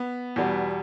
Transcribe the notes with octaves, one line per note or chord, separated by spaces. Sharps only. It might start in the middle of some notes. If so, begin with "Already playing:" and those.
Already playing: B3
E2 B2 G3